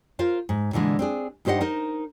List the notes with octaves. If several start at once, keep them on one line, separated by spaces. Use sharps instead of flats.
F4 A#4 C5 F5
G#2
A#2 D3 E3 G#3
C4 D4 G#4
G2 D#4 G4 C5 D#5 F#5
D#4 A#4 C5